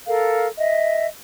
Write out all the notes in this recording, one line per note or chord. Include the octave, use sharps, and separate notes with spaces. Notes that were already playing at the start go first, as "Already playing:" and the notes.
A4 A#4 F5
D#5 E5